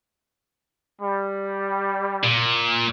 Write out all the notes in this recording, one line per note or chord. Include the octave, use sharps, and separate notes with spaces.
G3
A#2